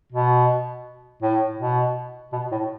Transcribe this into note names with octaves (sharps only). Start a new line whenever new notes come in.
B2
A2
B2
B2
A2